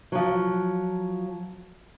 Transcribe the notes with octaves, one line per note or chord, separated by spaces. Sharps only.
F3 F#3